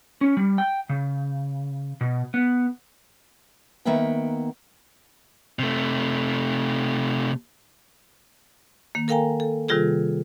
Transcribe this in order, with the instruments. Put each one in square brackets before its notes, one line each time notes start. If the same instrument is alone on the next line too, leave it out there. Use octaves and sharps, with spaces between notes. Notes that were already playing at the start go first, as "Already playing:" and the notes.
[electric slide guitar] C#4
G3
G5
C#3
B2
B3
[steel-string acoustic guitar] D#3 A#3 B3 E5 F#5 G5
[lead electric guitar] C3 A3
[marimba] D#3 A#3
A4 A#4 F5 G5 G#5 A#5
A4
C3 D#3 G3 F4 G#4 A4